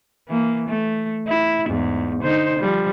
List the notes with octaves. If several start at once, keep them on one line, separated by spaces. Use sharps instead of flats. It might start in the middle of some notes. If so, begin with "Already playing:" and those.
E3 A#3
A3
E4
E2 G#2
D3 D#4 C5
F3 G3